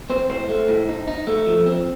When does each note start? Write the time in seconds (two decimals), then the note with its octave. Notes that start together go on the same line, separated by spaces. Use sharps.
0.10 C4 C5
0.29 A2 C5
0.49 A3
0.68 A2
0.89 D#4
1.08 D#4
1.27 A3
1.46 F3
1.66 C4